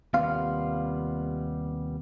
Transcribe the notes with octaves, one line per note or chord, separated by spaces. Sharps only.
D#2 C3 G3 B3 F4 F5